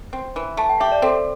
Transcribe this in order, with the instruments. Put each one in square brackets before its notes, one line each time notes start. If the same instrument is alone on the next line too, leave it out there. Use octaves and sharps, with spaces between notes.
[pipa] C4
E3
[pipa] A3 [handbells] A5
[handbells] G5
[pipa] G4 [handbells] E5
[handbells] D5
[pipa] C4 [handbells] A4